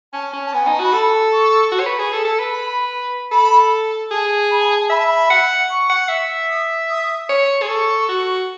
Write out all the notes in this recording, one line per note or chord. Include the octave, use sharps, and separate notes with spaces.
C#4 A5
C#4
A5
B3 G#5
G#5
D#4
A5
F#4 B5
A4
C#6
F#4
C#5
B4
G#4
A4
A4
B4
B5
A4 B5
G#4 A5
B5
A5
A5
A5
E5 B5
A5
B5
F#5
C#6
F#5
E5
D#6
D#6
C#5
G#4
A4 C#6
F#4